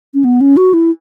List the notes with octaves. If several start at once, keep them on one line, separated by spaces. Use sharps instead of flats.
C#4
B3
C#4
F#4
E4